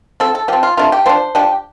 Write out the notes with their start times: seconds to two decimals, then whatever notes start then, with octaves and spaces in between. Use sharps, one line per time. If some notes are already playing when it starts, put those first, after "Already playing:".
0.20 F3 C4 A4
0.35 A4
0.48 F3 C4 G4
0.63 F4
0.77 C3 A3 D4 F4
0.92 G4
1.06 F3 D4 C5
1.35 F3 D4 G4